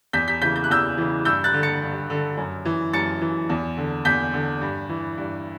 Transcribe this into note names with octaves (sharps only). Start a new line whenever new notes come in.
E2 G6 B6
G6 B6
C#3 E3 G6 B6
G6
F#6
E2 E6 G6
C#3 E3
G2 E6 G6
F#6 A6
D3
A6 C#7
G2
D3
F#2
E3
F#2 A6 C#7
E3
E2
D3
E2 G6 B6
D3
G2
E3
G2